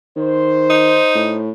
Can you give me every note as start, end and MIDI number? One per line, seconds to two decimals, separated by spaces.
0.16 0.98 51
0.16 1.42 72
0.70 1.39 63
1.15 1.52 45